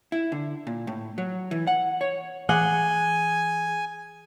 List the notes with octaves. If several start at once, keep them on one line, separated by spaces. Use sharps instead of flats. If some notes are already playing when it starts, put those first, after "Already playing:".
E4
D3
A#2
A2
F#3
E3
F#5
C#5
E3 G#4 F#5 G#5 G7